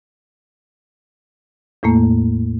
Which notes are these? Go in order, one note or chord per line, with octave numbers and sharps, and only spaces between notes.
E2 A2 A3 A#3